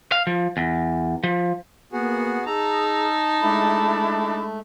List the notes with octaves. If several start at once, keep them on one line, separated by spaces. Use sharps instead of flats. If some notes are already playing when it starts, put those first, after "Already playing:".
F5
F3
E2
F3
A#3 B3 F#4 G#4
D#4 G#4 A5 A#5 E6
G#3 A3 D4 E4 B5